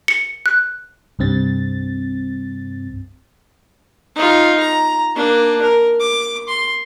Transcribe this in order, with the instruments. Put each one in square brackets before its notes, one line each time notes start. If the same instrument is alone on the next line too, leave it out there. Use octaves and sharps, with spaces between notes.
[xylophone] C#7
F#6
[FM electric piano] C2 G2 C4 A6
[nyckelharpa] D#4 F4
A#5
A#3 D4
A#4
D6
C6